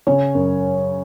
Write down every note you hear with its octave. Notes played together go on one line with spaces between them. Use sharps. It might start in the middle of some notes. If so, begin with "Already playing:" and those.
C#3 C#4 C#5
F#2